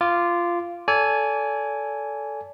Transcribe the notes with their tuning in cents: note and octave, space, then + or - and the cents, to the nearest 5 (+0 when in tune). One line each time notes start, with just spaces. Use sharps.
F4 -10 D6 +0
A4 +0 D5 -35 G#5 +0